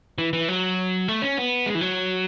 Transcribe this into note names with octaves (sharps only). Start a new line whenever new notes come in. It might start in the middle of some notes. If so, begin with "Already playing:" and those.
E3
E3
F#3
A3
C#4
B3
G#3
E3
F#3